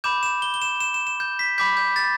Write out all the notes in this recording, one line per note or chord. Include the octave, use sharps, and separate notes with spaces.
B5 D6 G6 E7
E7
G7
G7
E7
E7
E7
E7
G6
B6
B5 D6 G6 B6
G6
A6